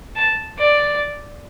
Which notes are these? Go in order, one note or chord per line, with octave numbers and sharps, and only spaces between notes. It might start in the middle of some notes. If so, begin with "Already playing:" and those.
A5
D5